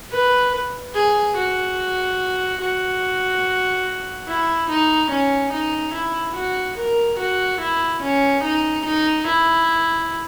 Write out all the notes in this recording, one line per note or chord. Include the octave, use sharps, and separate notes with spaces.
B4
G#4
F#4
F#4
E4
D#4
C#4
D#4
E4
F#4
A#4
F#4
E4
C#4
D#4
D#4
E4